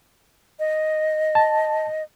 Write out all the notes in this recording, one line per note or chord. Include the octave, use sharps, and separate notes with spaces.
D#5
A5